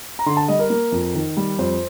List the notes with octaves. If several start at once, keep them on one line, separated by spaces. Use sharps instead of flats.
A#5
D3 C6
A5
G3 D#5
A#4
A#3
F2
D#3
G3
F2 C5